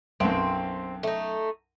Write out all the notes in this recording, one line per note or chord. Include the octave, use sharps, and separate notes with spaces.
B1 F#2 C4
A3 D#4